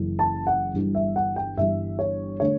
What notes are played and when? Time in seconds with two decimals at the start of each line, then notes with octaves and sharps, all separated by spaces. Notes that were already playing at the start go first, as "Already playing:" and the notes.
Already playing: F#1 F#2 E3
0.19 A5
0.47 F#5
0.74 G1 G2 E3 G3
0.95 E5
1.16 F#5
1.36 G5
1.57 G1 G2 E3 G3 E5
1.99 C#5
2.40 D3 A3 C#5